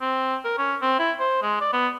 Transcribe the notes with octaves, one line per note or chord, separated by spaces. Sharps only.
C4
A#4
C#4
C4
E4
C5
G#3
D5
B3